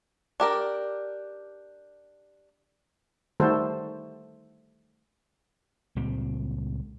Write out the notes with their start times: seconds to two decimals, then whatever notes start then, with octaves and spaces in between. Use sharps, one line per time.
0.40 D4 G4 A#4
3.40 D#3 G3 A3 F#4 A4 C5
5.96 C#2 A#2 G3 C4